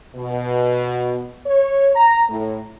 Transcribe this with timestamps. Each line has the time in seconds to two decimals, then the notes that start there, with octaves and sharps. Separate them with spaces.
0.16 B2
1.46 C#5
1.96 A#5
2.30 A2